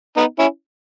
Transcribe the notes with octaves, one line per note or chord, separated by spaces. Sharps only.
B3 D#4
C#4 E4